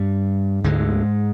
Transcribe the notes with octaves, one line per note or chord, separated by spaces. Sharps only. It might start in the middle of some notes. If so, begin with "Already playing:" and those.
Already playing: G2 G3
D2 G#2 D3 G#3